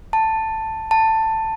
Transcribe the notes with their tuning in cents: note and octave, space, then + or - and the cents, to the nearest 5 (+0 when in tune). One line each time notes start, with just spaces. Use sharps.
A5 +5
A5 +15